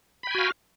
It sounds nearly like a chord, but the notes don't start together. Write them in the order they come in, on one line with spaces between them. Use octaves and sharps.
B5 G5 G#5 F#4 F5